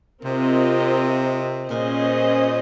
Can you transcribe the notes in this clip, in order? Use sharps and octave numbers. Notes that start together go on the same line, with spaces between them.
C3 C4 F4 A#4 D#5
A#2 C#4 G#4 C5 D#5